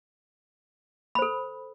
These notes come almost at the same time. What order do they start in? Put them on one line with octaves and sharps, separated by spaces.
B5 C5 A4